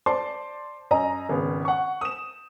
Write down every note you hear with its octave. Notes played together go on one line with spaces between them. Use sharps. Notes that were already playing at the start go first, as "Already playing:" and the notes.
C5 D5 A5 C6
F#2 D#5 A#5
G#1 C#3 B3
F#5 C#6
D#6 E7